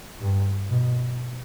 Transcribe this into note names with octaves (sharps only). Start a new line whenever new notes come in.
G2
B2